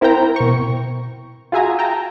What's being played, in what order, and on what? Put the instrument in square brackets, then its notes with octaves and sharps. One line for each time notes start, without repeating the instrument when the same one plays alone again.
[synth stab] C4 E4 A#4 C5 G5 A#5
B2 C#6
F4 F#4 G#4 E5 G#5 A#5
G5 A5 A#5